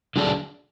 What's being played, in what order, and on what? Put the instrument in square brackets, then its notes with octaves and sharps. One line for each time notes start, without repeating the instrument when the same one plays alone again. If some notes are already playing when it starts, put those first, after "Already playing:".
[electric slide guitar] D3 F#3 D4 G#4